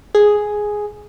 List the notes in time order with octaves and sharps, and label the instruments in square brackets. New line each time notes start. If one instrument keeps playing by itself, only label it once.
[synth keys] G#4